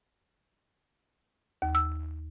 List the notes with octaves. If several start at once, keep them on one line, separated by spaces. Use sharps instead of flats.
D#2
E6